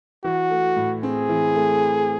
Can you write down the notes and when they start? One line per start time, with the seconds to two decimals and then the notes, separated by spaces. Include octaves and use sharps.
0.24 E3 F#4
0.50 A3
0.76 A2
1.03 C4 G#4
1.29 E3
1.56 A3